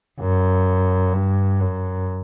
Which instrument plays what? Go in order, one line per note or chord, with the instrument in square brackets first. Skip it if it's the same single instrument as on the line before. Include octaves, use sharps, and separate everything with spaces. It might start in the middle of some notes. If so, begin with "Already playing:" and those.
[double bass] F#2
G2
F#2